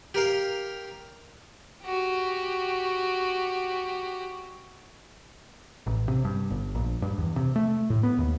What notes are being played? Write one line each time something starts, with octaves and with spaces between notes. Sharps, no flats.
G4 A#4 F5
F#4 G4
A1
C3
G2
G1
A#1
G2
E2
C3
A3
A2
B3
D#2